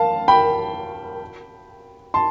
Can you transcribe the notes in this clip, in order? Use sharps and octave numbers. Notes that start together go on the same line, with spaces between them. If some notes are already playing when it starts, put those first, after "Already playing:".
Already playing: F5 A5
G5 B5
A5 C6